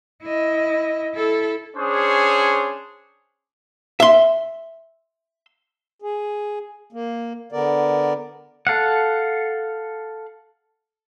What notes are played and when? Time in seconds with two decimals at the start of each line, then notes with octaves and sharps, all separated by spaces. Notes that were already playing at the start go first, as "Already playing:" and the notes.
0.23 E4 D#5
1.15 E4 A4
1.76 C#4 D4 G#4 C5 C#5
4.00 E5 C6
6.02 G#4
6.93 A#3
7.52 D3 B3 A#4 D5
8.67 A4 F5 F#5